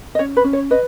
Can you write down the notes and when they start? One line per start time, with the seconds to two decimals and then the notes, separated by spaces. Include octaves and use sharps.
0.15 D#5
0.19 C#4 C#5
0.37 B4
0.44 C#4
0.53 C#5
0.71 B4 D#5